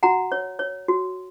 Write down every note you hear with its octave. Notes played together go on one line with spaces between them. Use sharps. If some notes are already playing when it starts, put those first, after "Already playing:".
F#4 F#5 A#5
C#5
C#5
F#4